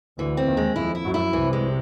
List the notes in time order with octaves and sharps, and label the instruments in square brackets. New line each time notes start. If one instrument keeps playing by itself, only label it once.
[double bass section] D2 D3 [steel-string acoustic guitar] E3
[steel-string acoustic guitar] C4
[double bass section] D#2 D#3
[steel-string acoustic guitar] G#3
[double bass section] F2 F3 [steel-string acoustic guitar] E4
[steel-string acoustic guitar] E4
[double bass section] F#2 F#3
[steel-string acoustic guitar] E4
[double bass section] C2 C3 [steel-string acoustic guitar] E3
[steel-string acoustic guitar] G#3